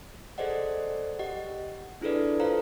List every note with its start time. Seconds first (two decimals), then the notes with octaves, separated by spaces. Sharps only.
0.38 G#4 A4 C5 D5 D#5 F#5
1.19 G4 D#5 F#5
2.01 D4 E4 G#4 A4 B4 D5
2.40 F4 A4 B4 C5 F5 A#5